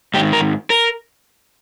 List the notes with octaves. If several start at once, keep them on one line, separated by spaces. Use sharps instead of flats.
G#2 D#3 G4
A#4
A#4